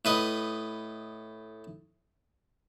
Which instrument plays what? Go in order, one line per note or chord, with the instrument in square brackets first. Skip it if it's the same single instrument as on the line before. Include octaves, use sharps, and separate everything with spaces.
[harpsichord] A2 B4 D#5